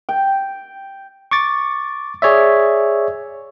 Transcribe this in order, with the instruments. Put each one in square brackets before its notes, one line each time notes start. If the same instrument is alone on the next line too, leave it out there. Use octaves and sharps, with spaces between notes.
[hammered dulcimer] G5
[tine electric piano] C#6 D6 A6
G#4 C#5 D5 E5